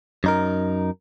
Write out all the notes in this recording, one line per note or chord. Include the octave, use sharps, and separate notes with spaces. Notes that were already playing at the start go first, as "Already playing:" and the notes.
F#2 D#4 A#4